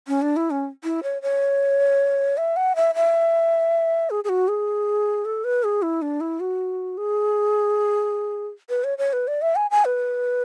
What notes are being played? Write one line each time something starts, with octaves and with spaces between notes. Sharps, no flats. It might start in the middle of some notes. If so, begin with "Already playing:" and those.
C#4
D4
E4
C#4
E4
C#5
C#5
E5
F#5
E5
E5
G#4
G#4
F#4
G#4
A4
B4
G#4
E4
D4
E4
F#4
G#4
B4
C#5
C#5
B4
D5
E5
G#5
G#5
B4